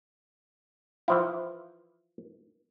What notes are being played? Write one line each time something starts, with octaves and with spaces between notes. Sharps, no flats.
E3 F3 E4